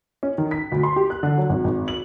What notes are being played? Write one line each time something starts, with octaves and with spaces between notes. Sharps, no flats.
C#4
D#3
B6
D2
C6
G4
F#6
D3
F#3
G#1
G#1
F#7